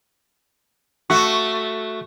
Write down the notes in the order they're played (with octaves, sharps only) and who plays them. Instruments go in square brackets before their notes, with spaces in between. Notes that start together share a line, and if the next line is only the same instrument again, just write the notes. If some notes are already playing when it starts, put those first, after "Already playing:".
[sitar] A3 F#4 [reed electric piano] C#6